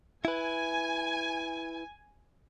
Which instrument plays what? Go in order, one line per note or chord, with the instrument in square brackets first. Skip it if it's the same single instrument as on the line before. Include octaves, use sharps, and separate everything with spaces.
[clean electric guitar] E4 B4 [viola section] G#5